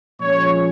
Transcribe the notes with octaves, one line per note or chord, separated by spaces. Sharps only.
A#2 F3 G#3 C#4 C#5